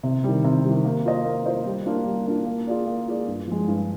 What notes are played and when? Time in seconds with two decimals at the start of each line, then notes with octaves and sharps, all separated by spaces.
0.03 C3
0.24 D#3 G3
0.44 C3
0.64 G3
0.69 D#3
0.84 A#3
1.05 F4 C5 D#5
1.25 A#3
1.46 F4 C5 D#5
1.66 G3
1.86 A#3 D4 F4
2.06 G3
2.27 A#3 D4 F4
2.46 A#3
2.67 F4 G#4 D5
2.87 A#3
3.08 F4 G#4 D5
3.28 G2
3.48 F3 G#3
3.68 G2